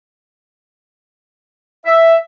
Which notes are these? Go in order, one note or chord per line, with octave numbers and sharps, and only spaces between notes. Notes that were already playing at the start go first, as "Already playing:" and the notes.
E5